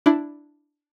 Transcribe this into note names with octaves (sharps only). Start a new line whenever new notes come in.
D4 E4